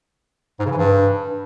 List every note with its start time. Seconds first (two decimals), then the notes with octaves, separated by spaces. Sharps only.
0.60 G#2
0.65 C#3
0.71 E3
0.77 G2